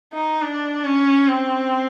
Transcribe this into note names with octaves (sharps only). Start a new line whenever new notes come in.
D#4
D4
C#4
C4